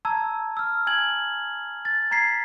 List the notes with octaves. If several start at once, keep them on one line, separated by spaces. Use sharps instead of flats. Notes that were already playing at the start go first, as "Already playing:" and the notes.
A5 A#5 E6 G#6
E6 F6
G#5 G#6 F#7
A6
A#5 G#6 B6 C7